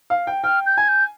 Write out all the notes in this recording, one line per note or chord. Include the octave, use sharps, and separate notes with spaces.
F5
G5
G5 F6
G6
G#5 G#6
G6